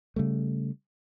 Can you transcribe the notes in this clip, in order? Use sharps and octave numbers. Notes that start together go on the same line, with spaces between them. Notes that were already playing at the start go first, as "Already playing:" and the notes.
C#3 G3 A3